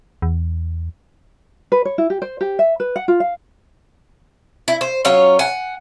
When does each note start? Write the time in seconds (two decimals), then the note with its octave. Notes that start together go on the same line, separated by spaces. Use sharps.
0.22 E2
1.72 B4
1.85 C#5
1.98 E4
2.10 G4
2.22 C5
2.41 G4
2.59 E5
2.80 B4
2.96 F#5
3.08 F4
3.20 F5
4.68 E4
4.81 C5
5.05 F#3 C#4 F4 C#5
5.39 F#5 G#5